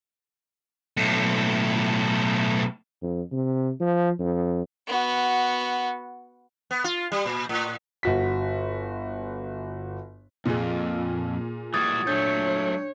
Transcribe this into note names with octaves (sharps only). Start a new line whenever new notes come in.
B1 A2
F2
C3
F3
F2
B3 F#4
B3
F4
G3
A#2
A2
G1 F#4 B6
F2 A#2 G#4
E3 G3 F#4 D#6 G#6 A6
F#3 A3 D4 C#5 G6